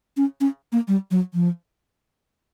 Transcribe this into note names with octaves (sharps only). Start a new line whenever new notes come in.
C#4
C#4
A#3
G3
F#3
F3